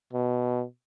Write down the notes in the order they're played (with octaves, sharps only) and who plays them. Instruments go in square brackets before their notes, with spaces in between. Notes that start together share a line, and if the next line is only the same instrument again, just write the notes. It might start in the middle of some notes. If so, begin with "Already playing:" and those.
[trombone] B2